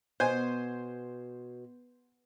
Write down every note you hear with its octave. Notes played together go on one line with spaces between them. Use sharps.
B2 C5 G#5